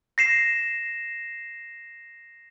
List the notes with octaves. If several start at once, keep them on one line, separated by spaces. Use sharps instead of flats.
A#6 C7 E7